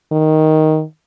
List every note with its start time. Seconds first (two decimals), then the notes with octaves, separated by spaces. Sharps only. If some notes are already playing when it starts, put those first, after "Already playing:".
0.12 D#3